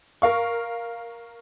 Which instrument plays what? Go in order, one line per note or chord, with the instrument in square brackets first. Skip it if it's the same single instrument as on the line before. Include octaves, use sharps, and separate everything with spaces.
[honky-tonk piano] A#4 F5 C#6